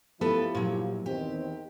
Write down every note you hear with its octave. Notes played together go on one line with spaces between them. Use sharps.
F3 B3 E4 G4 A4 B4
A#2 F#3
E2 D#3 C4 G4